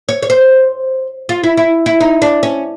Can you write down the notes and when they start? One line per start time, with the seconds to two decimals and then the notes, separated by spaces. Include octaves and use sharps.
0.09 C#5
0.22 C#5
0.30 C5
1.29 F4
1.44 E4
1.57 E4
1.86 E4
2.01 D#4
2.22 D4
2.43 C#4